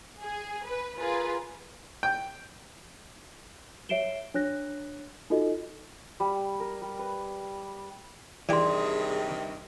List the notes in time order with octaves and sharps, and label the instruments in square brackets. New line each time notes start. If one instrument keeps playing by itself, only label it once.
[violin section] G#4
B4
F4 G#4 A#4 B4
[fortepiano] G5
[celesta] C#5 E5 C7 D7 E7 G7
D4 C#5 F#6 A#6
D#4 F4 F#4 A4 D#5
[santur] G3
A#4
G3
B4
[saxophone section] G2 C3 D#3 [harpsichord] E3 G4 [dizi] G#4 [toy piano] D5 C6